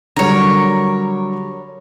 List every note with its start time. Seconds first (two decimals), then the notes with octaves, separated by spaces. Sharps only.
0.16 D3 F#3 G3 A#4 C#5